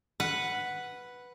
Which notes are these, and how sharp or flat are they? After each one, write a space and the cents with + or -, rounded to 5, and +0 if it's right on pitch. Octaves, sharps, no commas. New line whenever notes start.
B4 +0 F#5 +0